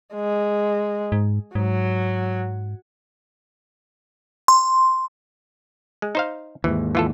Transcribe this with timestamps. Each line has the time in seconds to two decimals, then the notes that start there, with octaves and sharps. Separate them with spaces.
0.14 G#3
1.12 G#2
1.55 G#2 F#3
4.48 C6
6.02 G#3
6.15 D#4 C5 F5
6.64 D#2 G#2 E3
6.95 E3 F4 A4